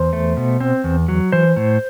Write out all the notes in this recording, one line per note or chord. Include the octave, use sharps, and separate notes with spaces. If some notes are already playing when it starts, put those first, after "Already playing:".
Already playing: E2 C5
A3
B2
C4
E2
F#3
E3 C5
A2